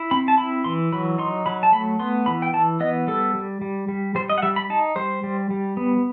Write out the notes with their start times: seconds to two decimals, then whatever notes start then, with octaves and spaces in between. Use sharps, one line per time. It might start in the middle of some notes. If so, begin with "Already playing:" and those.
Already playing: E4
0.11 C4 B5
0.28 A5
0.38 E4 B5
0.64 E3 C6
0.92 F#3 B5
1.18 D#4 C6
1.46 F#3 B5
1.63 A5
1.72 A3 B5
2.00 B3 C6
2.26 E3 B5
2.42 G5
2.53 E3 A5
2.80 B3 D#5
3.07 G3 A4
3.35 G3
3.62 G3
3.88 G3
4.15 G3 C5
4.30 D#5
4.38 F#5
4.42 G3 E5
4.56 B5
4.70 D#4 A5
4.96 G3 C5
5.24 G3
5.51 G3
5.77 B3